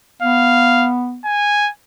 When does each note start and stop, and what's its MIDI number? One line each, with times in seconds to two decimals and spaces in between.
0.22 1.20 59
0.22 0.89 77
1.25 1.70 80